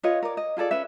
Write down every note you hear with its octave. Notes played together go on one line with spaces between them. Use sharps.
F4 B4 C#5 D#5
A#4 D5
D#5
F4 G#4 A4 D5
C#4 B4 E5